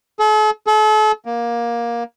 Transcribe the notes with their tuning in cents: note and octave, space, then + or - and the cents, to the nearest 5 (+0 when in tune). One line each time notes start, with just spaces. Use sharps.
A4 -45
A4 -40
A#3 +15